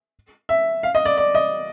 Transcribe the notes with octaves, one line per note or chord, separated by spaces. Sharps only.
E5
F5
D#5
D5
D5
D#5